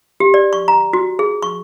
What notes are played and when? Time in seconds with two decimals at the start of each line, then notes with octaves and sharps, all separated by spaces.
0.20 G4
0.34 D5
0.53 C#6
0.68 A#5
0.93 F#4
1.19 G#4
1.42 C#6